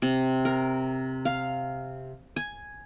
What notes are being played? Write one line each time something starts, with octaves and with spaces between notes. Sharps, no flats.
C3
A#4
F5
G#5